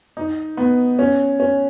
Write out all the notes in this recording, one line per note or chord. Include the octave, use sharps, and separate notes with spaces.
D#4
B3
C#4
C#4